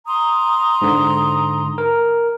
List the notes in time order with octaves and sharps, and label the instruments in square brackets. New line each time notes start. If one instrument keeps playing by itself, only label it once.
[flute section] A#5 C6 D#6
[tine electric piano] G#2 D3
A#4